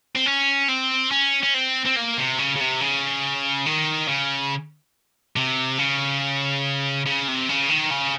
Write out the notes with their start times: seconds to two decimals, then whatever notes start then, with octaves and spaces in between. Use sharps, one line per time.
0.16 C4
0.26 C#4
0.69 C4
1.11 C#4
1.43 C#4
1.54 C4
1.85 C4
1.96 A#3
2.17 C3
2.38 C#3
2.56 C#3
2.60 C3
2.81 C#3
3.66 D#3
4.09 C#3
5.36 C3
5.78 C#3
7.06 C#3
7.28 C3
7.49 C#3
7.70 D#3
7.91 C#3